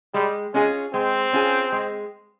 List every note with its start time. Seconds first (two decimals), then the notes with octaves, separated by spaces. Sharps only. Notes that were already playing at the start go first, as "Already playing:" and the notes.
0.14 G3 G#3
0.54 G#3 C#4 F4 G#4
0.93 G#3 C4
1.33 C#4 F4 G#4
1.72 G#3